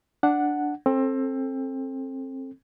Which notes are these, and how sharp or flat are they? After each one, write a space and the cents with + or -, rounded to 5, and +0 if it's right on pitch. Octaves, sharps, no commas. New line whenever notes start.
D4 +0 F#5 +0
C4 +25 A4 +0